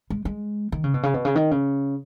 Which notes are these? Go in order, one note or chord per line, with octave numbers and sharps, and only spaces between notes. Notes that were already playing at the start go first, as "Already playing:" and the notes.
G#3
G#3
D#3
C#3
B2
C#3
B2
C#3
D#3
C#3